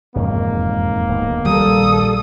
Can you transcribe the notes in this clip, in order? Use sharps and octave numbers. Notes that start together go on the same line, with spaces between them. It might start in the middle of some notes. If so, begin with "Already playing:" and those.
E1 F2 G#2 D#3 A#3
D1 D#2 B3
A#1 D#3 G3 A4 D#6